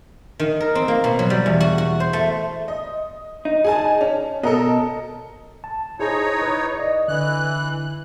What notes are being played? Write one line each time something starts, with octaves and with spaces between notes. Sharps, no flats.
D#3
A#4
C4
A#3
B2
F#3
G3
E2
F#4
F#4
C5
A3
D#5
D#4
G#4 G#5 A5
C#4
B2 A4 A#4 D#5
A5
D#4 E4 G#4 C5 C#5
B4
D5 D#5
D3 E3 F#6